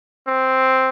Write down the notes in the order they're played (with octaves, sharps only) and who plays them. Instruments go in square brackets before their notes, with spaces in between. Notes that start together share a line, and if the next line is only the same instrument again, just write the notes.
[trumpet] C4